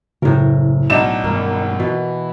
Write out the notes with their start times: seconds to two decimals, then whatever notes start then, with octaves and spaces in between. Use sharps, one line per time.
0.22 F#1 A2 A#4
0.90 B1 D4 D#4 E7
1.24 G2 B2 D#3 A#3
1.80 B2 E3